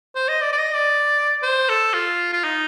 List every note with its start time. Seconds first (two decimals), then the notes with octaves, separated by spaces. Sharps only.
0.15 C5
0.29 D#5
0.41 D5
0.52 D5
0.58 D#5
0.74 D5
1.43 C5
1.69 A4
1.94 F4
2.33 F4
2.44 D#4